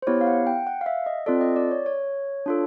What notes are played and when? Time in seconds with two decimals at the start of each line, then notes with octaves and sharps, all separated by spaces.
0.02 C5
0.07 B3 E4 G4 C#5
0.21 F5
0.27 F#5
0.47 G5
0.67 F#5
0.81 F5
0.86 E5
1.06 D#5
1.26 C4 F4 A4 D5
1.41 D#5
1.56 D5
1.71 C#5
1.86 C#5
2.46 D4 F4 A4